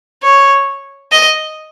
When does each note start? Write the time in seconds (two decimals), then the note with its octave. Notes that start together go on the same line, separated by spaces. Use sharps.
0.23 C#5
1.12 D#5